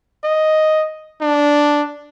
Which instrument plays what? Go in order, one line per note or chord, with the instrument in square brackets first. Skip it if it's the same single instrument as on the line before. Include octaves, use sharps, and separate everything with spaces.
[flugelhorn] D#5
D4